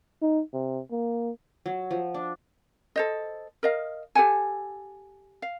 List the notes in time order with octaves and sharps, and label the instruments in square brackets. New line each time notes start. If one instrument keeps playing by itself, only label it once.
[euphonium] D#4
C3
A#3
[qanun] F#3
F3
D4
[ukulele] A4 C5 D#5
A#4 D#5 F5
G4 A4 F#5 G#5
F5